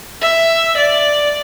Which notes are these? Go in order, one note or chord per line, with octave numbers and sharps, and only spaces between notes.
E5
D5